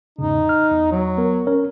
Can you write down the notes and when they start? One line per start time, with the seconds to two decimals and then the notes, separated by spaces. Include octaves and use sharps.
0.19 E2 G#2 C#3 D#4
0.49 F6
0.72 E2
0.92 F#3
1.17 B3 A#4
1.47 C#4 A#4 C#5